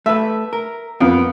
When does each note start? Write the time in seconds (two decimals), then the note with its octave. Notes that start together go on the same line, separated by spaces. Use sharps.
0.06 A3 B4 E5
0.53 A#4
1.00 F2 A#3 B3